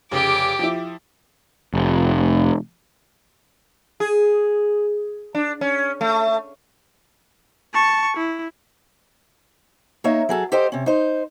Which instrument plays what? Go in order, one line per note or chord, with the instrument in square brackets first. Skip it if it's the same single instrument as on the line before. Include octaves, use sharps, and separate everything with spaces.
[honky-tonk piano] F1 C#3 [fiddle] G4 D6
[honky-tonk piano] F3 E4
[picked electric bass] F1
[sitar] G#4
D4
C#4
A3
[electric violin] A5 C#6
E4
[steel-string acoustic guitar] A#3 D#4 C#5 E5
F#3 G#4 A4
G4 A4 C5 D#5 G5
C3 C#4
D#4 C5